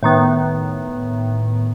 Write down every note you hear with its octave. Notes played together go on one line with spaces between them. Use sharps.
A2 D#3 B3